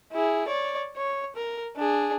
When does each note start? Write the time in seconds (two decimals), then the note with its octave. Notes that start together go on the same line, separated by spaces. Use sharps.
0.13 E4 G#4
0.48 C#5 D5
0.96 C#5
1.36 A#4
1.77 D4 G#4